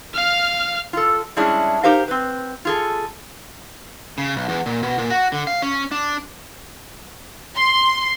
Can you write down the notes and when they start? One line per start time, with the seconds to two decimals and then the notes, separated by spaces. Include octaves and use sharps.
0.14 F5 F6
0.93 F4 A4
1.37 G3 G#3 C#4 D4 E4 G#4
1.84 D#4 G4 A#4 C5 F5
2.08 C4 B4
2.65 F4 G#4 A4
4.18 C#3
4.36 B1
4.49 E2
4.66 A#2
4.83 B2
4.98 A#2
5.10 F#4
5.32 D3
5.47 F5
5.62 C#4
5.91 D4
7.56 C6